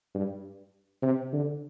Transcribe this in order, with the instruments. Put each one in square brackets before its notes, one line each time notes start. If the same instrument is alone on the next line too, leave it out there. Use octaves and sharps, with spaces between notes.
[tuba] G2
C3
D3